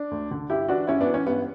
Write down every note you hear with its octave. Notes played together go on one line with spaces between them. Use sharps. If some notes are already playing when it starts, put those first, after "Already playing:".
Already playing: D4
D2
D3
G2 E4 G4
E3 D4 F#4
G2 C#4 E4
B3 D4
E3
C#4
G2 B3